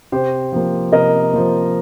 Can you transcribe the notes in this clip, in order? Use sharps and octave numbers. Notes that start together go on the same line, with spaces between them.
C3 G4 C5
F3 A#3
C3 A#4 D#5
F3 A#3